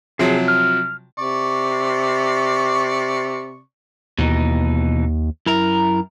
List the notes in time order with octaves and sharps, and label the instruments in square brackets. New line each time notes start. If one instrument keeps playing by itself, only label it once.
[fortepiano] C3 F3 F#3 [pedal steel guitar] G#4
[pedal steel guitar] F6
[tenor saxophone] C3 [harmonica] D5 C#6
[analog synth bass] D#2 [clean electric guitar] B2 E3 D#4
[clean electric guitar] F#2 A#4 A#5 [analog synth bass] E4